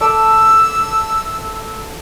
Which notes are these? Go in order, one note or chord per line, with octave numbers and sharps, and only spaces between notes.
A4 E5 D6 E6